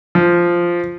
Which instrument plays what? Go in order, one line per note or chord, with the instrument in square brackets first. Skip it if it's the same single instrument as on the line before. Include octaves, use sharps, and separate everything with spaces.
[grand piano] F3